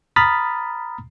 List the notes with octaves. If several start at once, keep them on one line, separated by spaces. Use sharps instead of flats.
A#5 B5 D#6 F6 A6 B6